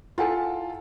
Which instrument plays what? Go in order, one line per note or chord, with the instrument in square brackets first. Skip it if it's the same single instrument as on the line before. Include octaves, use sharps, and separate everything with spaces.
[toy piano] E4 F#5 G#5 [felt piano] F4 A4